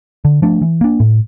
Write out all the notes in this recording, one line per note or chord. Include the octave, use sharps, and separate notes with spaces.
D3
F3 A3 D4
E3
A#3 D4
A2